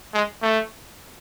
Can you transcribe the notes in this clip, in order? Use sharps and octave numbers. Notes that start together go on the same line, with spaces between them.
G#3
A3